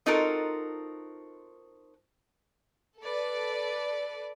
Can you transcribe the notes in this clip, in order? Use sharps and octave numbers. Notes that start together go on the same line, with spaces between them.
C4 D#4 F4 F#4 A4 A#4
A4 B4 D5